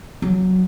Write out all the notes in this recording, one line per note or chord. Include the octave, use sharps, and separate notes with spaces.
F#3